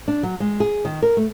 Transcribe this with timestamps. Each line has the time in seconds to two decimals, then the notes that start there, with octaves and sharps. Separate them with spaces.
0.08 D4
0.23 F#3
0.40 G#3
0.60 G#4
0.85 D#3
1.02 A#4
1.17 A3